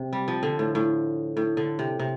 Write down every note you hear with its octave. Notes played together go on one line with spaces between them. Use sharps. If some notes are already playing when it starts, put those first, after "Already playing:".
Already playing: C3
G3
F3
D3
A2
A2
A2
D3
C3
C3